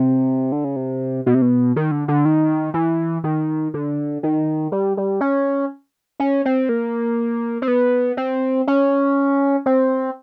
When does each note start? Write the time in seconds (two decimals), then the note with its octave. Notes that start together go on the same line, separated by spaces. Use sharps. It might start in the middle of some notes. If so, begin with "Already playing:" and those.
Already playing: C3
0.52 D3
0.64 C#3
0.76 C3
1.26 B2
1.35 C3
1.42 B2
1.76 D#3
1.91 D3
2.08 D3
2.25 D#3
2.74 E3
3.24 D#3
3.74 D3
4.23 D#3
4.72 G3
4.97 G3
5.21 C#4
6.20 C#4
6.45 C4
6.69 A#3
7.62 C4
7.68 B3
8.17 C4
8.67 C#4
9.66 C4